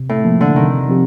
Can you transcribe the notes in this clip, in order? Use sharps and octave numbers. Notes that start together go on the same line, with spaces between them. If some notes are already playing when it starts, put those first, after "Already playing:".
Already playing: C3
A2
F3 A#3
D3
C3 D#3
F3 C4 G4